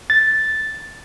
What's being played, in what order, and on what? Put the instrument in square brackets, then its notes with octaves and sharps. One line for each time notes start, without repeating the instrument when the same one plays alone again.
[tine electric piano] A6